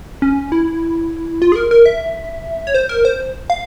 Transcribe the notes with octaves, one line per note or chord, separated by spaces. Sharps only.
C#4
E4
F4
G#4
A#4
A#4
E5
C#5
C5
A#4
C5
F5